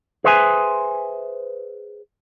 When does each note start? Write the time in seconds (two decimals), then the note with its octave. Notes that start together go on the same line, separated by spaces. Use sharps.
0.24 G#4 B4 C5 E5 F#5 G#5